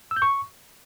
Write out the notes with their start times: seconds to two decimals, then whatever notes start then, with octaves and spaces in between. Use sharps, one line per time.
0.11 E6
0.16 G6
0.22 C#6